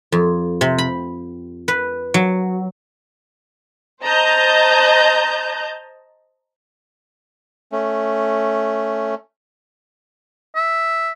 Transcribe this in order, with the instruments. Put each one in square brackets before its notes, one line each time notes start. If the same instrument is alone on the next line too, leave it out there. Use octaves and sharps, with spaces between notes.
[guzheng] F2
C3
B5
B4
F#3
[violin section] C5 D#5 A5 A#5 G6
[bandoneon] A3 C#4
[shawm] E5